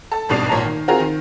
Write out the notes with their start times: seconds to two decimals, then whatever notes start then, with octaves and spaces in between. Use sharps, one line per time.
0.11 A4 A5
0.29 G#1 G2 B2 D4 C7 F7
0.49 G#1 A#2 C#5 A5 A#5
0.65 D#3
0.88 C4 F4 F#4 G#4 A#4 A#5
1.00 D#3